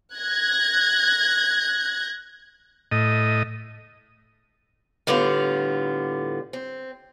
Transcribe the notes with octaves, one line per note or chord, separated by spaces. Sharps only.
F#6 G#6 A#6
A2 D#5
A2 D3 G3 B3 F4
C4